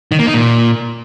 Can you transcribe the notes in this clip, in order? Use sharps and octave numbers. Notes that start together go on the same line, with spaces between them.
D#3
A#3
D#4
A#2